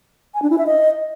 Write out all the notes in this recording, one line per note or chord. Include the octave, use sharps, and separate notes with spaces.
G#5
D4
E4
E5
D#5